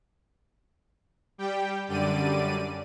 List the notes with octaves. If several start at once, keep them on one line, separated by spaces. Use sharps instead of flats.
G3 G4 G5
F#2 D3 G3 D5 D#7